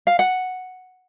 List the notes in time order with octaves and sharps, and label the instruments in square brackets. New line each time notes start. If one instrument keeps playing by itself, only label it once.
[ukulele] F5
F#5